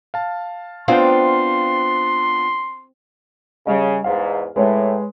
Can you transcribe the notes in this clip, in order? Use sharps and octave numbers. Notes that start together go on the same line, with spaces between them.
F5 A5
B3 C4 D4 F4 F5 G5 C6
C#3 G3 D#5
E2 G#2 F5
A2 G#3 B4 C#5